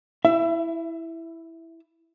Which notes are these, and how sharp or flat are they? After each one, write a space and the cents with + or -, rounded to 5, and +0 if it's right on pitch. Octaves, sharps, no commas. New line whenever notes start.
E4 +0 E5 +30